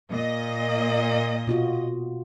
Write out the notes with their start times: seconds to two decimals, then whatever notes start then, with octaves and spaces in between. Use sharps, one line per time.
0.10 A#2 D#5
1.47 B2 F4 F#4